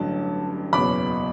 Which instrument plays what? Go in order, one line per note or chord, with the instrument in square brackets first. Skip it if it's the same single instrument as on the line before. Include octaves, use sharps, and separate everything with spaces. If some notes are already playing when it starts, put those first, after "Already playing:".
Already playing: [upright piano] A1 G2 D3 F#3 A5
F#1 E2 B2 F#3 B5 D6